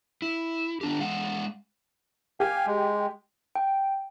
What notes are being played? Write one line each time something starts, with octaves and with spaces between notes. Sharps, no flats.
E4
B3 D4 G4
G#3 F5 F#5
G4 F5 G#5
G#3
G5